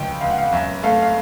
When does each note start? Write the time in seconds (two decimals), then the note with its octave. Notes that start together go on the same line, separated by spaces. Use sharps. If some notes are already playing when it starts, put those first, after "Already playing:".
Already playing: C#2 F3 G5
0.21 C#2 F5
0.31 F#5
0.38 F5
0.52 F#2 E5
0.83 A3 F5
1.02 F5